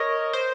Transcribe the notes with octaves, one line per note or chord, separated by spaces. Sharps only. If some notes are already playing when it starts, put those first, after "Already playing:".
Already playing: A#4 C#5 D#5
C5